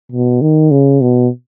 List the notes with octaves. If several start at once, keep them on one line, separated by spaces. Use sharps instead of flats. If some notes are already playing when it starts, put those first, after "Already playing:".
B2
D#3
C#3
B2